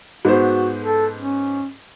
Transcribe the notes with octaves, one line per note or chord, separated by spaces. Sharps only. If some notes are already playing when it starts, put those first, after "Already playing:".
G#2 B3 F#4 C5
A4
C#4